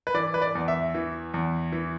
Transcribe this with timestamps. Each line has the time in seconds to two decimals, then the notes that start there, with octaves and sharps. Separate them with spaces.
0.07 B4
0.14 E3 D5
0.34 B4
0.42 D5
0.55 E2
0.68 E5
0.95 E3
1.34 E2
1.72 E3